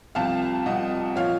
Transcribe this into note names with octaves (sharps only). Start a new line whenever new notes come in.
C2 C3 F3 F5 A5
C2 C3 F3 D#5 F#5
A#2 F3 C#5 F5